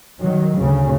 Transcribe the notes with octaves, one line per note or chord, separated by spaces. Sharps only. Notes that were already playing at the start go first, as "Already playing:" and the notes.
D#3 F#3
D2 C#3